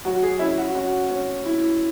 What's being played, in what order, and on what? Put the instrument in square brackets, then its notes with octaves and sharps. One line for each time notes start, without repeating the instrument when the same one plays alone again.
[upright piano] F#3 [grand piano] F#4
[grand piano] G#4
[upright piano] C#4 [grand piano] E4
[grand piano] F#4
[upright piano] C#4 [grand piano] F#4
[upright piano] C#4
E4